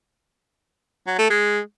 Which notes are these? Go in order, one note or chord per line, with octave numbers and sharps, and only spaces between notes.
F#3
A3
G#3